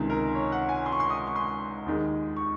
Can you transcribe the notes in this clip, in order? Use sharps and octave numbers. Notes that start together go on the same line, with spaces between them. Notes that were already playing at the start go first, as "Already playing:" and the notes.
Already playing: C#2 C3 D#3
A#4
C#5
F#5
G#5
C6
C#6
C6
D#6
C#6
C6
D#2 D#3 G#3
C#6